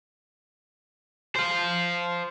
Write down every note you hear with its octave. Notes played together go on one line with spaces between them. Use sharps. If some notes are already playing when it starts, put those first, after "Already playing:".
C5 F5